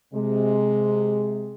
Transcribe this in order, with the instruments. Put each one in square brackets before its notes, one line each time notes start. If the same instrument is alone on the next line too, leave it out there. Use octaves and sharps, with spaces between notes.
[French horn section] C3 G#3